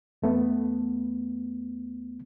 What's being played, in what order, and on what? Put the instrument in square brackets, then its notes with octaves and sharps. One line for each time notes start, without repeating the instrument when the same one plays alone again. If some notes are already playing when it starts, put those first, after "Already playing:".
[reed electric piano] E2 A3 B3